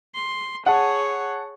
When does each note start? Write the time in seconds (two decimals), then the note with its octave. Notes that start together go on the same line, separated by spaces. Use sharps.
0.15 C6
0.66 G#4 C#5 F#5 A5